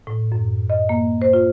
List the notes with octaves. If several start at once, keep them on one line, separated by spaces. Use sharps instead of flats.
A2
F#2
D#5
A#3
C5
F4